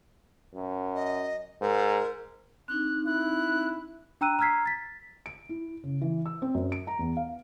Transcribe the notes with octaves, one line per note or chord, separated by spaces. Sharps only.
F#2
D#5
G#2 A#4
C4 D4 D#4 F#6
E4 F#6
D4 G5 A#5 E6 F#6 D#7
A#5 E6 F6 G#6 B6 C7
A6 B6
D7
E4
C#3
E3
E6
C4
F#2
D7
A#5
E2
F5